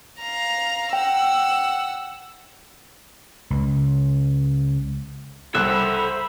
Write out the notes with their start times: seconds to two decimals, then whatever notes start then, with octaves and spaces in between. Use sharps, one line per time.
0.21 F5 A#5
0.93 F#5 G5 E6
3.50 C#2
5.55 C2 A4 C5 E5 F#5 B5 F#6